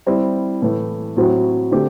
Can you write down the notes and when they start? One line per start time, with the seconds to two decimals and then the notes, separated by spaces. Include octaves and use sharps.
0.06 G3 C4 E4
0.62 A2 E3 A3
1.16 A2 F#3 C4
1.71 D3 A3 C4 G4